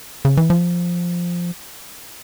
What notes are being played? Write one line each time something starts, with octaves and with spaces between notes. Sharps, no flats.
C#3
E3
F3